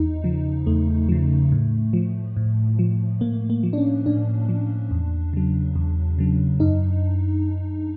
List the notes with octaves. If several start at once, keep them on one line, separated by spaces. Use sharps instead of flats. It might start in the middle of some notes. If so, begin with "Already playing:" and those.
Already playing: E2 D#4
C#3 F3
E2 A3
C#3 F3
A2
F3
A2
F3
A2 A#3
A#3
F3
D4
C#4
A2 D4
F3
E2
C#3 F#3
E2
C#3 F#3
F#2 D#4